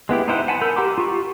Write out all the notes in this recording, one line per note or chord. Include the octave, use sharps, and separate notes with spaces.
G#3 B3 E4 G4
D#4 E4 C5 F#5
F#5 G#5 A5 B5
A#4 B5 E6 G6
G4 F#5 A#5 C6 D6
F4 G4 C#6